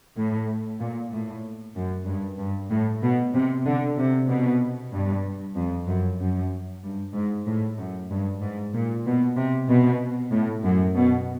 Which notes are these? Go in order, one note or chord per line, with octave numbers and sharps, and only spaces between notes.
A2
A#2
A2
F#2
G2
G2
A2
B2
C3
D3
C3
B2
G2
F2
F#2
F#2
G2
G#2
A2
F#2
G2
G#2
A#2
B2
C3
B2
A2
F#2
B2